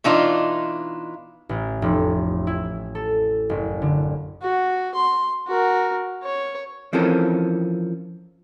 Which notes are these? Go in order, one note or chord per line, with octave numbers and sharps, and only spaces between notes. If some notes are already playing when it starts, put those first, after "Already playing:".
B2 E3 D4 D#4 F4
A1
F1
E4
A4
F#1
D3
F#4
C6
F#4 A#4
C#5
E3 F3 C4 C#4 A4 A#4